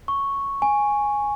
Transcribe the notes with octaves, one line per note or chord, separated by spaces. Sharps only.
C#6
G#5